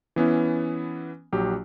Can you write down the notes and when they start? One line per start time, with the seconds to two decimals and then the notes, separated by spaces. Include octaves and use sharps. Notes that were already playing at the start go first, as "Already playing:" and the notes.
0.16 E3 B3 C#4 E4
1.33 A#1 F#3 G4